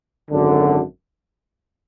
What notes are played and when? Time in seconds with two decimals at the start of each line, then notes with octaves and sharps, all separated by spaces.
0.31 G#1 F#2 D3